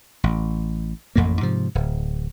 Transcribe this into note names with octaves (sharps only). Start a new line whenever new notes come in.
A1
A1 F2 A2 A#3
G#2 C3 F3
D1